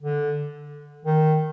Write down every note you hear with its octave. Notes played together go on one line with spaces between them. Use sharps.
D3
D#3